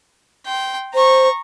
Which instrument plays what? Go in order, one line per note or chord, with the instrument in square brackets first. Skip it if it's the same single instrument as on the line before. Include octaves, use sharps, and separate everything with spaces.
[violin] G5 C6
[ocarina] C5 [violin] A#5 C#6